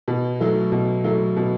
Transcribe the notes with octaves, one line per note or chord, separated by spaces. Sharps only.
B2
F#3 A3
B2
F#3 A3
B2